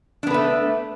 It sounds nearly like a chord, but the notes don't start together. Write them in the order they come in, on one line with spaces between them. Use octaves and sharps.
D4 B3 B4 A3